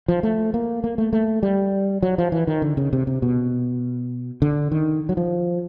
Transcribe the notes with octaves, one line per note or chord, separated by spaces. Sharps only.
F3
A3
A#3
A#3
A3
A3
G3
F#3
F3
E3
D#3
D3
C#3
C3
C3
B2
D3
D#3
F#3
F3